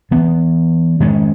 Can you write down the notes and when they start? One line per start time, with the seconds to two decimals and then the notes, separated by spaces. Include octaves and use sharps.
0.11 E3 B3
1.00 D#3 G#3 C#4